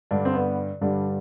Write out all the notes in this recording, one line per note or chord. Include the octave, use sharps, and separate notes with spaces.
G2 D3 G3 D4
C4
B3
G2 D3 G3 D4